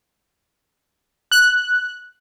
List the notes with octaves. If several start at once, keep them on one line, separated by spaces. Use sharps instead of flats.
F#6